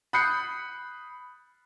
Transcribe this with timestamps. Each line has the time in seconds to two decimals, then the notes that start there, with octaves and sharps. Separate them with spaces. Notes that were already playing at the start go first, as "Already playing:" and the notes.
0.13 B5 D#6 F#6 G6 C7 C#7